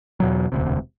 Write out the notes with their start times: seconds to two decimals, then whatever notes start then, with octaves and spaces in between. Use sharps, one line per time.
0.20 E2 B2 F#3
0.52 E1 D2 C3